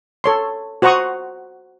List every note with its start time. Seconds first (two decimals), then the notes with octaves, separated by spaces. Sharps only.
0.24 A4 C#5 C6
0.82 F#4 C5 F#5 A#5 C#6 D#6